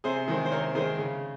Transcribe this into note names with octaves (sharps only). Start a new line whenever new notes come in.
C3 G#4 C5
D#3 G#3 C4
C5
C3 A#4 C#5
D#3 G#3 C4 G#4 C5
C#3